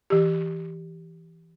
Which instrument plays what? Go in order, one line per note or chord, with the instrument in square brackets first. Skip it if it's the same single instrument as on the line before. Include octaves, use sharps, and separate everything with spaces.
[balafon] E3 G4